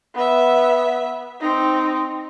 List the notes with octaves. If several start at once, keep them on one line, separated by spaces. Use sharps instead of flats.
B3 E5
C4 D#4